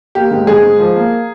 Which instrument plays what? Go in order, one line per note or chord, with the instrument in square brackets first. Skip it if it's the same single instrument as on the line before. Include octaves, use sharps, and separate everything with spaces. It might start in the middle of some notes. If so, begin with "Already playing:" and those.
[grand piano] A#3 [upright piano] G4
[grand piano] G#2
[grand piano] G#2 [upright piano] G#4
[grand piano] G#2
F3
A#3